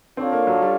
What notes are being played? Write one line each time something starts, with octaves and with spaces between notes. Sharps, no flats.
C4 D4 F4 A4 C#5 F5
A#3
F#3
G3